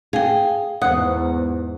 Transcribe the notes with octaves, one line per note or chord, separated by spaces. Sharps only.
G#4 F5 G5
E2 G#2 C5 F#5 D#6